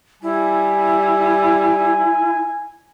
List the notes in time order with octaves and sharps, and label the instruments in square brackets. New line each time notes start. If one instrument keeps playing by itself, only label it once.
[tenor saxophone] G3 [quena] E4 [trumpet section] G#5